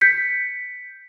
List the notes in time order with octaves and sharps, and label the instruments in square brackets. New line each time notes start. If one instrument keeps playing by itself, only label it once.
[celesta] G6 B6 C#7